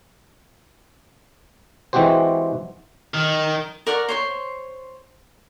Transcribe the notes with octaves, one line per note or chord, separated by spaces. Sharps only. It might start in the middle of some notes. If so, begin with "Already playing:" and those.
E3 G#3 C4 F#4 G4 C5
D#3
A#4 D5 F#5 C#6
C5 C#5 C6